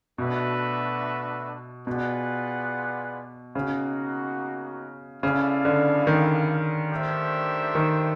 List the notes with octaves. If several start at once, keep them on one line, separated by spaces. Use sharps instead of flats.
B2 A3 D4 F#4 B4 E5
B2 F4 G#4 B4 D5 F#5
C#3 A#3 D#4 F#4
C#3 B3 E4 A4 D5 F5
D3
D#3
A3 D4 G4 C5 E5
D#3